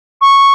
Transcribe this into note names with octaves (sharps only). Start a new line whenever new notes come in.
C#6